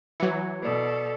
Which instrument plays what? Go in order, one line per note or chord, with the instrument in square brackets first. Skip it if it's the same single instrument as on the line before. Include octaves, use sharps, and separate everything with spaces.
[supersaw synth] E3 F#3 [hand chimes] G#6 C#7
[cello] B2 A4 [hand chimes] B4 D5 D#6